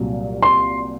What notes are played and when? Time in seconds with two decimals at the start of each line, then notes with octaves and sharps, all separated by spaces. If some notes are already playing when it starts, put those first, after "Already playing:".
Already playing: C2 A#2 F#3
0.42 C6